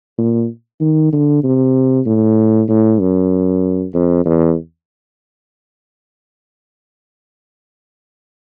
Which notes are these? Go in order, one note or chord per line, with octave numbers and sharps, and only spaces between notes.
A#2
D#3
D3
C3
A2
A2
F#2
F2
E2